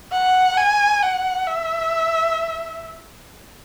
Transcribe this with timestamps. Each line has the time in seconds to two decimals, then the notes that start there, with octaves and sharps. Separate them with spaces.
0.12 F#5
0.58 G#5
1.02 F#5
1.46 E5